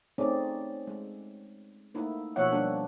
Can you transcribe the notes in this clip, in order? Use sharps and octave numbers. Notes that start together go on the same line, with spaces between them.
A3 C4 C#4 D#4 G#4 D5
G#3
A3 A#3 D#4 E4
B2 F3 A#3 C#5 E5 F#5
G3 A#3 D4 G4